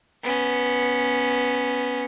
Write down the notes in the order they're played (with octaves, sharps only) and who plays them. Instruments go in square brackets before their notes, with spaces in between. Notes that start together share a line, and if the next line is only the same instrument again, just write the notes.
[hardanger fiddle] B3 C#4